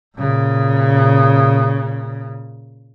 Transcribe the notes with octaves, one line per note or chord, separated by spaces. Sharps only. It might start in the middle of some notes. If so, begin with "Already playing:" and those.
A#2 C#3